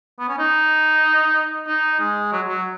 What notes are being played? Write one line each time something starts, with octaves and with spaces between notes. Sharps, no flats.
B3
C#4
D#4
D#4
G#3
F#3
F#3